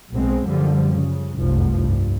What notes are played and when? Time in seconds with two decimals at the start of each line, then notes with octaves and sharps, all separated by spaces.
0.13 B1 B2 G#3 C4
0.44 F#2 D3 F3 G3
0.90 C#3
1.36 F1 C2 F#2 F3
1.79 C2 G2